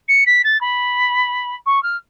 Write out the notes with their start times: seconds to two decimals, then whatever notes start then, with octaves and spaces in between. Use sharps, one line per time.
0.08 C#7
0.26 B6
0.44 A6
0.61 B5
1.66 C#6
1.83 F6